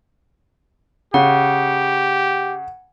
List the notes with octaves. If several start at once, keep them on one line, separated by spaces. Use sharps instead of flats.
C#3 G4 F#5